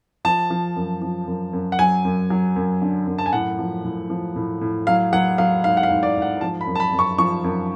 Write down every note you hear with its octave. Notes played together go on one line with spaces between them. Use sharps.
F3 A5
F3
F#2
F3
F#2
F#2
F#5
F#3 G#5
F#2
F#3
F#2
D3
F#2
A5
G#5
A2 F#5
F3
A2
F3
A2
A2
F#3 F5
F#3 F#5
F#3 F5
G#2 F5
F#5
F5
G#2
D5
G#2
F#5
F3 A5
B5
F#2
A5
B5
F#2
C#6
F3 C#6
F#2